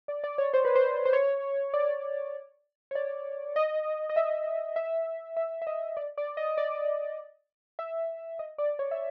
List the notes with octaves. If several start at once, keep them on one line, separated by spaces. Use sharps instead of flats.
D5
D5
C#5
C5
B4
C5
C5
C#5
D5
C#5
D5
D#5
D#5
E5
E5
E5
E5
D#5
D5
D5
D#5
D5
E5
D#5
D5
C#5
E5